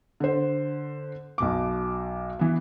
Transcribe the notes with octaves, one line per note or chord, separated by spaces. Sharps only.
D3 C5
B1 B2 D6
E3 B3